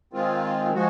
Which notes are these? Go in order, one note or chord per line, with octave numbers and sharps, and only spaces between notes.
D#3 G#3 C4 F4
F3 G#3 F#4